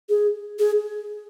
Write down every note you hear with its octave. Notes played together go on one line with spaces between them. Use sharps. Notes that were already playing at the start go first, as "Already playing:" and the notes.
G#4
G#4